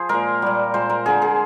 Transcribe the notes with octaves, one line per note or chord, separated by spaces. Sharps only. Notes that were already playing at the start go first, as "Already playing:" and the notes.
Already playing: F3 G#4 C5
A#2 G#3 A#4
A#2 G3
A#2 G#3 C5
A#4
D3 G#3 G#4
G#4